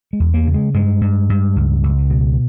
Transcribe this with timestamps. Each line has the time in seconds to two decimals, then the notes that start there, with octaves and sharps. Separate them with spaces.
0.13 G#3
0.20 E2
0.34 A#3
0.47 C#3
0.54 G#3
0.74 G2 G#3
1.01 G2
1.29 G2
1.56 C#2
1.83 C#2
2.10 B2